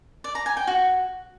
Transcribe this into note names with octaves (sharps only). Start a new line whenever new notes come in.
D5
A#5
G#5
G5
F#4